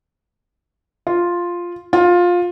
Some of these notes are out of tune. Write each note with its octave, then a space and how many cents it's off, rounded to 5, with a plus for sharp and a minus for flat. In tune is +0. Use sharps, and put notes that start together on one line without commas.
F4 +0
F4 +15